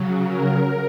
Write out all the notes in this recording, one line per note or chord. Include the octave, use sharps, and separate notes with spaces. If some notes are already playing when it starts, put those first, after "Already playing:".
Already playing: C#3 F#3
A#4